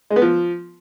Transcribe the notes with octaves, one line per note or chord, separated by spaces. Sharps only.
G#3
B3
F3